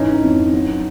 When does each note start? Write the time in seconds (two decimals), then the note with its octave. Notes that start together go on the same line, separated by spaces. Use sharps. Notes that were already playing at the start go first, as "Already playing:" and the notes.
Already playing: G#2 E3 C#4 D#4
0.23 F2
0.54 F#3